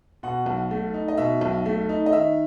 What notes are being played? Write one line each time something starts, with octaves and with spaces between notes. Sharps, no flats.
B2 F#5
B1
A3
D#4
D#5
B2 E5
B1
A3
D#4
D#5
D#3 E5